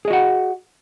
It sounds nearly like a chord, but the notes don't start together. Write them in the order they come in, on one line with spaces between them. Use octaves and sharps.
G#4 D#5 F#4 F#5